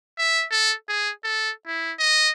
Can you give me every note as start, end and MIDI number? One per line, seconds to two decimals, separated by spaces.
0.18 0.45 76
0.51 0.74 69
0.89 1.11 68
1.24 1.51 69
1.67 1.92 64
1.99 2.31 75